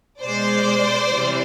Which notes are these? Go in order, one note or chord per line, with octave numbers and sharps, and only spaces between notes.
B2 G#3 C5 D5
C3 E3 G3